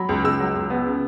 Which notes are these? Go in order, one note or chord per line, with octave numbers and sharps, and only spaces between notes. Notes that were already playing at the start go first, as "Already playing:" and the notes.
Already playing: F#3 B5
C#2
C#2 E6
F#3
C#2
B3
C#3